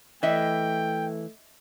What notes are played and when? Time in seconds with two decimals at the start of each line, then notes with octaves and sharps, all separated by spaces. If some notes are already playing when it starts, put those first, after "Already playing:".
0.23 E3 A3 D#5 E5 G5